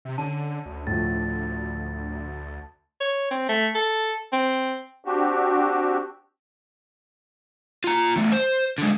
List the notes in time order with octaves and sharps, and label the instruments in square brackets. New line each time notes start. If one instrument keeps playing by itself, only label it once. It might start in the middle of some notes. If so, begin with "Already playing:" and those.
[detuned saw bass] C3
[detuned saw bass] D3 [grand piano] C#4 [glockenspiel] A5
[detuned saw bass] D2
[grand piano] A2 F3 [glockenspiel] A6
[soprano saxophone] C#5
C4
A3
A4
C4
[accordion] C4 D4 F#4 G4
[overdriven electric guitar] F4 A#5
E2 A3
C5
D3 G#3